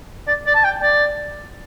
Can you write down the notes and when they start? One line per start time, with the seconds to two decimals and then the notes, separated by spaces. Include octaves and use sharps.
0.27 D5
0.46 D5
0.55 A5
0.64 G5
0.82 D5